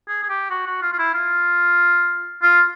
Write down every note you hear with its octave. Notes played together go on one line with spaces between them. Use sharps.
G#4
G#4
G4
F#4
F#4
F4
F4
E4
F4
F4